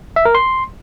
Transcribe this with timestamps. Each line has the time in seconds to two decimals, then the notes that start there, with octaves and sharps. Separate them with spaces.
0.16 E5
0.25 A#4
0.35 C6